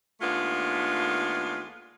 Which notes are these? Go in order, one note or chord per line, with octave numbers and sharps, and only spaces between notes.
D#2 G#3 A3 B3 D4 F4